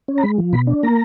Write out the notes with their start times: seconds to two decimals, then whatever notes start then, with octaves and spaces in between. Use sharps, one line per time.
0.08 C#4
0.18 A#5
0.22 G#3 B5
0.38 F3
0.53 B2 B5
0.67 D4
0.83 A#3 A#5